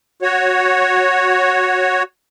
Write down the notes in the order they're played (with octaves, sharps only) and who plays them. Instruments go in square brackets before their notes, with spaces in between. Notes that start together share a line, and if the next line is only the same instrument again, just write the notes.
[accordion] F#4 C#5